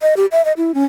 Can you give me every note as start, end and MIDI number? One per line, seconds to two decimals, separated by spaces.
0.02 0.14 75
0.17 0.26 67
0.32 0.44 76
0.45 0.53 75
0.57 0.74 64
0.74 0.85 61